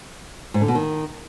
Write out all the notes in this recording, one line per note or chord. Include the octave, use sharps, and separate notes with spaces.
G#2
D3
B2
D#3